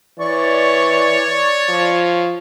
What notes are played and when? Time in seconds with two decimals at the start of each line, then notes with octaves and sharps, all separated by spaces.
0.19 E3 C#5 D5 C#6
1.69 F3